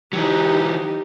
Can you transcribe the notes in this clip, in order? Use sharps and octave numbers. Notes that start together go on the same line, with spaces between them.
E3 F#3 D#4 G4